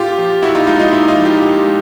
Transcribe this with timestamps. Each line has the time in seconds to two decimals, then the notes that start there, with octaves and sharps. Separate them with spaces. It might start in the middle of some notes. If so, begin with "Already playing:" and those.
Already playing: A#2 F4 G4
0.18 F3
0.42 A#2 E4 F#4
0.55 D#4 F4
0.67 G#3 D#4 F4
0.79 D#4 F4
0.92 A#2 E4
1.08 D#4 F4
1.16 F3
1.25 F4 G4
1.41 A#2
1.66 G#3